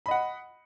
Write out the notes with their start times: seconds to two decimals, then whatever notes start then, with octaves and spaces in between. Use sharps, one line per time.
0.06 B5
0.08 D#5
0.11 F#5